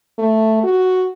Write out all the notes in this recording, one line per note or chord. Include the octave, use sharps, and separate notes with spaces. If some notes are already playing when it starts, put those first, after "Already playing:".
A3
F#4